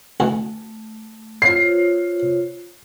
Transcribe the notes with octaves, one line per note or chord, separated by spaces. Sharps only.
D2 E3 A3
F4 C5 C#5 C7